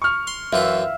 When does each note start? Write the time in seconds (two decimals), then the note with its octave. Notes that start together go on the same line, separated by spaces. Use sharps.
0.02 C#6 F6
0.27 C6
0.53 F#2 E3 F4 E5 F5